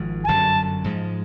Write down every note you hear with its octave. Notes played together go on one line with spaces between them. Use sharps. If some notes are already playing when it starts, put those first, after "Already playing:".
Already playing: G#1 G#2 F3
G#5
G1 F#2 D3 F#3 A5
G#2 F3 G#3